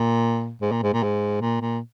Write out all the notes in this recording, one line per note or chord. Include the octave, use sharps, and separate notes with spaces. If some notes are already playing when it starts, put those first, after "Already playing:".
Already playing: A#2
G#2
A#2
G#2
A#2
G#2
A#2
A#2